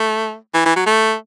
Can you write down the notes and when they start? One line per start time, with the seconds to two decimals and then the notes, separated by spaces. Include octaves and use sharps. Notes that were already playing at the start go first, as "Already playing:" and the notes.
Already playing: A3
0.54 E3
0.66 E3
0.76 F#3
0.86 A3